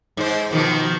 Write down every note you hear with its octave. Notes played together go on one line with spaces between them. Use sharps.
G#2 C5
B2 D#3 F3